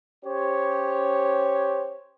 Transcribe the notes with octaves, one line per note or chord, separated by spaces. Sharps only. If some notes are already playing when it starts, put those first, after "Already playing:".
C#4 G4 C5 C#5